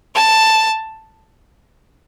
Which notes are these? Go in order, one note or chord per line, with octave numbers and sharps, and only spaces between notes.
A5